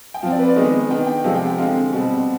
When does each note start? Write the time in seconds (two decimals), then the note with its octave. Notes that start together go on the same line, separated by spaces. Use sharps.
0.14 G5
0.22 F3 C4 F5
0.31 D5
0.39 B4
0.48 D5
0.56 D#3 G#3 B3 D#5
0.90 D#3 B3 D4 G5
1.07 G5
1.24 C3 F3 G#3 F5
1.35 G5
1.47 G5
1.58 D3 G#3 C4 F5
1.92 B2 G3 C4